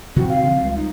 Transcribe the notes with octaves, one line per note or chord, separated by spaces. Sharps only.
C3 D#3 E3 C4 F#4
F5
C#3 E3 F3
C#2 G3
D#4